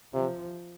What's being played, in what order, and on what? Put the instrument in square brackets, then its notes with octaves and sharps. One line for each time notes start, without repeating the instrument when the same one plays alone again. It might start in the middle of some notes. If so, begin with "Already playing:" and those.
[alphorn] C3 [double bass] F3